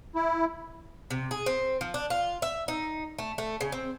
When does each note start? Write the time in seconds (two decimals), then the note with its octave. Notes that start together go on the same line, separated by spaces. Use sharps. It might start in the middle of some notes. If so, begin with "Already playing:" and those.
0.15 E4
1.10 C3
1.31 G#4
1.46 C4
1.81 F3
1.94 D4
2.10 F4
2.42 E5
2.68 D#4
3.18 A3
3.38 A3
3.61 C#3
3.72 C4